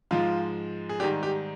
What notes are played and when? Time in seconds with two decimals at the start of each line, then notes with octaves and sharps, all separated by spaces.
0.11 G#2 F3 G#3 F4
0.89 G#4
1.00 G#2 D#3 G3 G4
1.23 G4